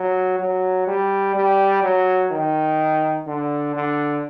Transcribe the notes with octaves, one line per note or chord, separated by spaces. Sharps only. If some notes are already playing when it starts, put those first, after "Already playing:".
Already playing: F#3
F#3
G3
G3
F#3
D#3
D3
D3